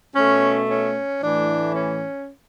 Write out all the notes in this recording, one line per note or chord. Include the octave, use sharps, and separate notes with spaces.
B2 A3 C#4
C#4
A2 E3 A3 D4
C#4